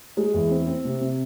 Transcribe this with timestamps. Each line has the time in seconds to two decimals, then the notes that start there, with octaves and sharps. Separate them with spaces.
0.17 G#3
0.34 E2
0.51 C4
0.67 C4
0.85 C3
1.01 C3